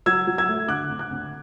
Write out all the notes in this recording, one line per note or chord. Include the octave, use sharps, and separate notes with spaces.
F#3 E6 G#6
F#3
E6 G#6
A3
D3 D6 F#6
D2
D6 F#6
D2